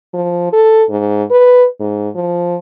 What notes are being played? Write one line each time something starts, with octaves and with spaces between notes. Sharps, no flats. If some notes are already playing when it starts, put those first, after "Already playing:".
F3
A4
G#2
B4
G#2
F3